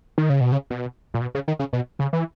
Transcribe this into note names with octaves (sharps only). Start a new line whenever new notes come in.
D#3
C#3
B2
C#3
B2
A#2
B2
C#3
D#3
C#3
B2
C#3
E3